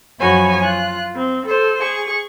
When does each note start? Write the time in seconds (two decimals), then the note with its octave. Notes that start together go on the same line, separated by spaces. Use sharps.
0.19 F#2 F3 F#4 C#5 G#5 B5
0.62 F4 F#6
1.15 C4
1.47 A4 C5
1.79 G#4 C#6